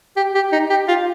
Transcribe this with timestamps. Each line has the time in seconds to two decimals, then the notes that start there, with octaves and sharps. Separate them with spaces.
0.17 G4
0.35 G4
0.52 D#4
0.70 G4
0.88 F4